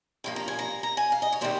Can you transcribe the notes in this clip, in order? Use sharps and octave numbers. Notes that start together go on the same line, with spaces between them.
G2 F3 A#3
A#5
G#5
A#5
A#5
G#5
F5
D#5
C#5
C3 D#3 G3 A#3 C5